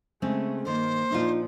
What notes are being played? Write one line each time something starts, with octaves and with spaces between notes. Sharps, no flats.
C#3 G#3 A3 C4
G2 D#3 A#3 C5
A#2 F3 D4 D#4 F4